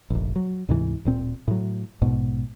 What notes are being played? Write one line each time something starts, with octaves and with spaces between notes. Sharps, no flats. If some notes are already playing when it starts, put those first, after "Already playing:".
F1 A#1
F#3
D2 G#2 C3 E3
D1 A#2 C4
A2 F#3
A#1 G#2 B2